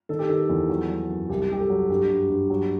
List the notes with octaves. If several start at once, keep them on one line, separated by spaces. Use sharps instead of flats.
D#3 A4
G4
D#3 A4
E2
F#3
F#3
F#2
C2 G4
C2 G4
A4
F#3
G2 G4
G2
G2
F#3